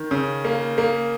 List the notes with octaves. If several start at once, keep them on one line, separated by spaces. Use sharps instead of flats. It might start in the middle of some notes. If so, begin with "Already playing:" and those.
Already playing: D#3
C#3
A#3
A#3